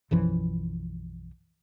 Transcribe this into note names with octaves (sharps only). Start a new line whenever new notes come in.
B1 F#2 E3 F3